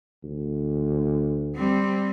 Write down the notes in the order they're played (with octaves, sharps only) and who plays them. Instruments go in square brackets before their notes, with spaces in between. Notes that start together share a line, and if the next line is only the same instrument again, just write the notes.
[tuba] D2
[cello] G3 C4